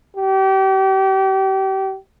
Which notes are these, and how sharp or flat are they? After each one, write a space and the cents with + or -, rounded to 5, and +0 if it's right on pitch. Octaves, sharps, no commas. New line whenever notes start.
G4 -35